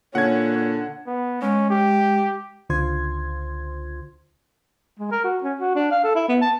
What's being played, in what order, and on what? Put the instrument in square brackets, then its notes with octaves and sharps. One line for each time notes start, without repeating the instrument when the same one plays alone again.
[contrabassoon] A#2 [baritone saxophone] D3 [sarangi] C#4 [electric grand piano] F#5 G#6
[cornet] B3
[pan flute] G#3 [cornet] C#4
[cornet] G4
[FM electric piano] C#2 D3 F4 C5 C6 G#6
[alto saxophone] G#3
A#4
F#4
C#4
F#4
D4
F5
A4
E4
B3
A5